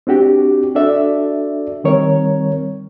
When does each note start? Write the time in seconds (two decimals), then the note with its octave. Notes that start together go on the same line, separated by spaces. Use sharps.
0.07 C4 D4 F#4 G4
0.75 D4 F#4 A4 D5 E5
1.84 D#3 G3 C4 A#4 C#5